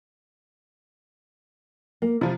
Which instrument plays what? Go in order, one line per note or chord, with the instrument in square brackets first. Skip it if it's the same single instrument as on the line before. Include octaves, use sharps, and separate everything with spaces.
[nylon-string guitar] A#3
[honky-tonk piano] C3 F3 [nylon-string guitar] E4